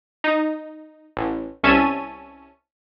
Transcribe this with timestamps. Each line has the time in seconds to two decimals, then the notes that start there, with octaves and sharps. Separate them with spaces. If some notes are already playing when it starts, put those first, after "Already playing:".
0.24 D#4
1.17 A1
1.64 C2 C#4 E5 A5 D#7